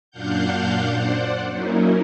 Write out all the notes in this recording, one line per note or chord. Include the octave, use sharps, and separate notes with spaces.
F#2 A#2 D4 F5 F#5 G6
C5 D5 F#5
F#3 A#3 C#4 D#4 E4 A#4